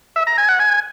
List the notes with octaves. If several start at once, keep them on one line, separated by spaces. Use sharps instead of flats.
E5
A#5
G#5
F#5
G#5